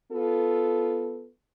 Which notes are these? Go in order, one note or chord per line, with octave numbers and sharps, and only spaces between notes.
B3 F4 A4